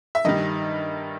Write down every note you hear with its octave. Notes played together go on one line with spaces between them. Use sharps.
E5
G2 D#3 G3 D#5